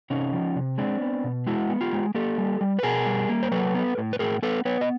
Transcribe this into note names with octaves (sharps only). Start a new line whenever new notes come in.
C3 C#4 D#4
F3
C3
G#3 C4 D4
B3
B2
G#3 E4 F#4
B3
F4 G4
G#3
A#3 G4 A4
G3
G3
B4
B2 G#4 A#4
G3
A#3
C5
F#3 A4 B4
B3
A2
B4
A2 G#4 A#4
B3 A4 B4
B3 B4 C#5
D#5